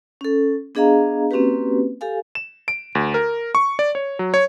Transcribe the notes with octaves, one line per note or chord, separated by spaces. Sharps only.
C#4 A4
B3 D4 G#4 D#5 F5 A#5
A#3 C4 C#4 F#4 G4 B4
G4 A4 F5 G#5
E7
D7
D2
A#4
C#6
D5
C#5
F#3
C#5